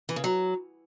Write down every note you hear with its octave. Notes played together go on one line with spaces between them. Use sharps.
E3
C#3
F#3